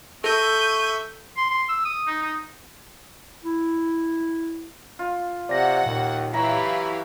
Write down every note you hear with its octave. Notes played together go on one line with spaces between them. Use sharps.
A4 E5 C#6 G6 D#7
C6
C6
E6
D#6
D#4
D#4
E4
F4
C3 F#4 D5 F#5 A#6
D#2 A#2
E3 F#3 E4 G4 F5 A#5 C#6